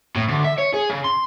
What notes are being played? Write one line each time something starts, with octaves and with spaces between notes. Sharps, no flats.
A2
D2
E5
C#5
G#4
C#3
C6